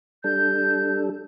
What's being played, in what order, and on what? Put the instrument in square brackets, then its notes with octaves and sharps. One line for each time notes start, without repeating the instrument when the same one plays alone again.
[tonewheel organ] G3 D4 A4 [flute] G6